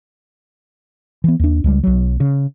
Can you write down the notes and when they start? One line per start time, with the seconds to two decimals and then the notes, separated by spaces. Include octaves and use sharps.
1.24 E3 B3
1.39 D#2 D4
1.64 C#2 G3
1.84 B1 F#3
2.20 C#3